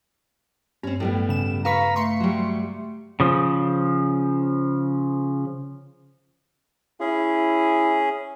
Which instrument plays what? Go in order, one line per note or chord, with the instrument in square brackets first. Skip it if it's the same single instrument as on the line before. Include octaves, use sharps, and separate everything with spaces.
[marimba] G2 [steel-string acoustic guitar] C4 C#4
[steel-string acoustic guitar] A2 G3 B3
[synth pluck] C#3 E7
[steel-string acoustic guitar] B4 [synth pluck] F5 C#6 B6 [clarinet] A#5
[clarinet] A3 [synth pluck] C6 C#6 C#7
[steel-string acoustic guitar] F#3 G3
[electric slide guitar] C#3 F3
[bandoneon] C#4 G#4 [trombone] E4